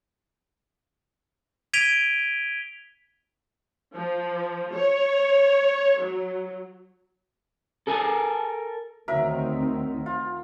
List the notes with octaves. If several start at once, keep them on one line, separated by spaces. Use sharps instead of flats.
G#6 B6 D7 D#7 F7 G7
F3
C#5
F#3
A4 A#4 G#5
D2 D#3 F#3 C4 A#4 E5
F4